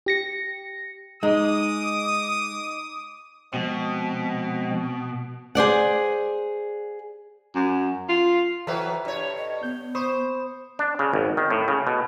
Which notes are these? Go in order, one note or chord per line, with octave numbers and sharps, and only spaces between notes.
G4 A#6 C#7
G#3 D#4 D6 D#6
B2 F3 G#3 C4
G#4 C5 D5 F#5
F#2
F4
E3 F#3 A4 B4 E5 G5
G2 C#5
D#5
B3 G6
C5 B5 C#6 D#6
D4
C#3
G#1
D#3
A2
C#3
B2